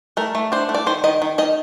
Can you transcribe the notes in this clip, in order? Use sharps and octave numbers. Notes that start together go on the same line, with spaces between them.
A3 A#4
A3
D4 C5
A3
D5
D#3 C5
D#3 D#5
D#3
D#3 D#5